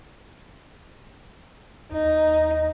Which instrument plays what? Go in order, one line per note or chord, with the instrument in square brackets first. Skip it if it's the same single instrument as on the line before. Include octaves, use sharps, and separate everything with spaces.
[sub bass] D#2 [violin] D#4